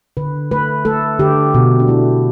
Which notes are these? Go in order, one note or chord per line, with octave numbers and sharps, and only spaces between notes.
D3 B4
A3 B4
A3 A4
D3 G4
B2 F#4
D4
A3 E4